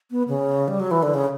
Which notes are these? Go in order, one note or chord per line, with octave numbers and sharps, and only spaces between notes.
B3
C#3
G3
F#3
E3
D3
C#3